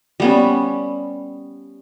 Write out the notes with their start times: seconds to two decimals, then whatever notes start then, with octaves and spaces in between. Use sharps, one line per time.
0.20 G3 B3 C#4